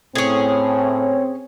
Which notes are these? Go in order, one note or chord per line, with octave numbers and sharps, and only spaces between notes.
A2 C4 C#4 G#4 C#5